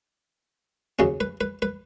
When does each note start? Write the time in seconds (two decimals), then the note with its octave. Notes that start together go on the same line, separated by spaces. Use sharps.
0.99 D#2 C#3 F#3 C#4
1.20 B4
1.41 B4
1.62 B4